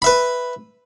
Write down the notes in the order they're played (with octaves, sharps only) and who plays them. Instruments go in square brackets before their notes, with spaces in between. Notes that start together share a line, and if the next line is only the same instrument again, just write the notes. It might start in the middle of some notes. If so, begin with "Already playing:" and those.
[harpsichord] B4 E5 B5